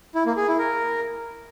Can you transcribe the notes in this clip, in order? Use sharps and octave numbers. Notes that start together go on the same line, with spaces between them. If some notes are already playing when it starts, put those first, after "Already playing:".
E4
A#3
G#4
E4
A#4